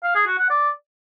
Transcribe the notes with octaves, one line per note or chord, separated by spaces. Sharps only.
F5
G#4
F#4
F#5
D5